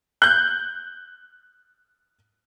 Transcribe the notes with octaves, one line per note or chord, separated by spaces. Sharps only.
F#6 G6